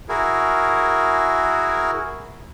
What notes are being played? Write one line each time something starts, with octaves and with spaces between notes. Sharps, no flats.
E4 F#4 G#4 A#4